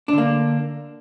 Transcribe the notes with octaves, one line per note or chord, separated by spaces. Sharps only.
D3 A#3 D4